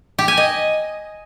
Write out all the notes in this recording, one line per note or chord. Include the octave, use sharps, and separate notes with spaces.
G4
G#5
D#5